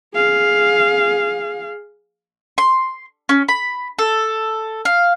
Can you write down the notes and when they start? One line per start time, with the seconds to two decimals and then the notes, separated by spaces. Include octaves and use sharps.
0.14 G#4 F5
2.58 C6
3.29 C#4
3.48 B5
3.99 A4
4.85 F5